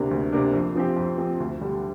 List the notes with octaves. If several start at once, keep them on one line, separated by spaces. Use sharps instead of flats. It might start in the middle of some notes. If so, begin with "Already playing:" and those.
Already playing: D2 C3 A#3 D4
D2
C3 A#3 D4
F2
F3 C4 G4
F2
F3 C4 G4
D2
D3 G3 D4 G4